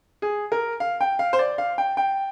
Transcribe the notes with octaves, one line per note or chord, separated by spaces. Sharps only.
G#4
A#4
F5
G5
F5
C5
D5
F5
G5
G5